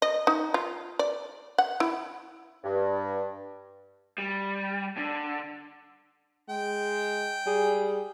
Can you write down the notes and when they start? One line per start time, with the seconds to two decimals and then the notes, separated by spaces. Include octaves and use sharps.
0.02 D#5
0.27 D#4
0.54 F4
0.99 D5
1.58 F#5
1.80 E4
2.63 G2
4.18 G3
4.97 D3
6.50 G#3 G5
7.47 G3 G#4